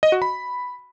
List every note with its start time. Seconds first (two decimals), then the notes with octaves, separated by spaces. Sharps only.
0.03 D#5
0.12 F#4
0.22 B5